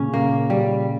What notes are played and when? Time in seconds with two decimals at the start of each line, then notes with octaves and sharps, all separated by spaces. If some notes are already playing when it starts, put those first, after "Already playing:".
Already playing: A#2 C#3 C#4
0.14 A#3
0.50 G3